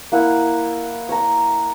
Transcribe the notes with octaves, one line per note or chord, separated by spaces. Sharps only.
A#3 E4 F#5
C#5 A#5